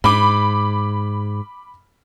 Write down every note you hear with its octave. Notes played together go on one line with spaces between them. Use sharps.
G#2 B5 D6